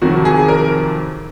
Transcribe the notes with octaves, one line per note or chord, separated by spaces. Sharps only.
F2 C3 D#3 F#3 F#4
G#4
A#4